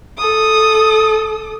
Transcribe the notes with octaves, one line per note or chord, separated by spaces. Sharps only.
A4 D#6